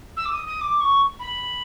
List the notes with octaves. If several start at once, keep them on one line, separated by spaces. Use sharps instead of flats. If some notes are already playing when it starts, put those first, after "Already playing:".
E6
D6
D#6
D#6
D6
C#6
B5